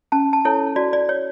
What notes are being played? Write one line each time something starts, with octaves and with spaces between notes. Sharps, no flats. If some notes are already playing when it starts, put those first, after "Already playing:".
C#4 A5
A5
E4 A4 C#5
F#4 D5
D5
C#5